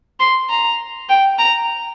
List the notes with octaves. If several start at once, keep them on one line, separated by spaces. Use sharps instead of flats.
C6
A#5
G5
A#5